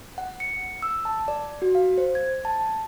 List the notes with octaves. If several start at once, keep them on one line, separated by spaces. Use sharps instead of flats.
F#5
C#7
E6
A5
D5
F#4
F5
C5
G#6
A5